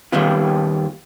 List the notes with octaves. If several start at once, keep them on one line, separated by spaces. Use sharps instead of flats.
D#2 D#3 G3 B3 F4